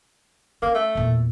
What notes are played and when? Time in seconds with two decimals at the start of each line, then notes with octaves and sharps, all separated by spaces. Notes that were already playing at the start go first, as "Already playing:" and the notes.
0.62 A#3 C#4
0.75 A3
0.95 E2 A#2